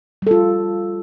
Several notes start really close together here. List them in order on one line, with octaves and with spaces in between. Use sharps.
G3 A4 F4